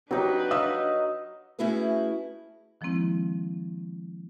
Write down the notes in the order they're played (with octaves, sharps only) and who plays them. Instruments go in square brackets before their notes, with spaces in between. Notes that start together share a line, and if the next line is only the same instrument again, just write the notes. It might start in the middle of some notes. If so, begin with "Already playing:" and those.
[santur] F#3 D#4 [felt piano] C4 G4 [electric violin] D4 B4
[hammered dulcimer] D#5 [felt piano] F5 D#6 E6
[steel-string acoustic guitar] A3 C#4 E4 F#4 G#4 B4
[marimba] D#3 F3 G#3 A#3 C4 E4